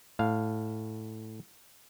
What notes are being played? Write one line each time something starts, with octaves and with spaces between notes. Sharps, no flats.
A2 F5